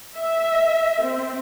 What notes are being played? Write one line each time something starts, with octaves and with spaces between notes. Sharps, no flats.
E5
C4